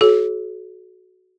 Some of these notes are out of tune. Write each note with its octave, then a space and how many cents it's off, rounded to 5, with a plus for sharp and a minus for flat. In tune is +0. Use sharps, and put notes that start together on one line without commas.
F#4 +0 A4 -45 C#5 -15